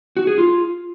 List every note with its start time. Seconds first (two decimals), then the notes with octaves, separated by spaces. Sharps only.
0.17 F#4
0.27 G#4
0.38 F4